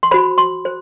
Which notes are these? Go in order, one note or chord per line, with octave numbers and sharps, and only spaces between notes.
C6
F#4 C5 B5
C6
C5